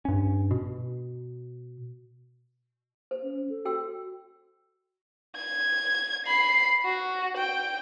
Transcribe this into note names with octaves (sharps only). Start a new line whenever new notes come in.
G2 C#4
B2
C5
C#4
A4
F#4 G5 E6
G#6
B5 C7
F#4
G5